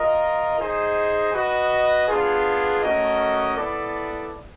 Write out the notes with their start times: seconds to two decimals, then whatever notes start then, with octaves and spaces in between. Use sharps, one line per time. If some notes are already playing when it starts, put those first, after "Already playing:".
Already playing: F4 A#4 D#5
0.59 D#4 G#4 C5 D#5
1.34 F#4 B4 D#5
2.08 B3 D4 F4 G#4
2.82 A3 C#4 F#4 A#4 D#5
3.57 B3 E4 A4 D5